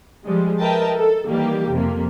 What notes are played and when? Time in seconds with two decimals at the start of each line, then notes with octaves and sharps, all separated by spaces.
0.25 F3 G3 G#3
0.60 A#4 B4 D#5 E5 G5 A5
0.96 A4
1.26 D#3 E3 G3 A#3 G4
1.69 F2 C3 A#3